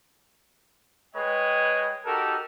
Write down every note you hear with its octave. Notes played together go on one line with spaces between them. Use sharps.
G#3 B4 C#5 D#5 G5
D#4 F#4 G4 A4 A#4